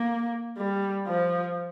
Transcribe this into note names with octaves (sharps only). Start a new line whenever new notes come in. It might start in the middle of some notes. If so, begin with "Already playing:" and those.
Already playing: A#3
G3
F3